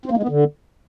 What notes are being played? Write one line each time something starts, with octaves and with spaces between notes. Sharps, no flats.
C4
A#3
G#3
B3
D3